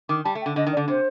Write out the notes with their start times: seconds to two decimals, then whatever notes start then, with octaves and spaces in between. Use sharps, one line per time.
0.09 D#3 D6
0.24 G3 A5
0.35 A3
0.41 G5
0.46 D3
0.56 D3 D#5
0.67 D#3
0.72 D5
0.77 D3
0.88 C3 C5